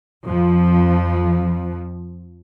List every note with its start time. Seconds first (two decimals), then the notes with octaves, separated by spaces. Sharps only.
0.25 F2 F3